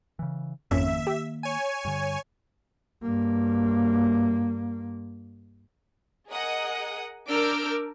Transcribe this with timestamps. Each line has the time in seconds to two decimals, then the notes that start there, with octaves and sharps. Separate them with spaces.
0.19 C#3 E3
0.71 G#1 F2 D#3 A#3 C#4 E5
1.07 G4
1.43 C#5 G#5
1.85 G2 D3
3.03 G2 A#3
6.29 G#4 A#4 D#5 F#5 D#6
7.29 D4 A#4 D6 E6 F6 G6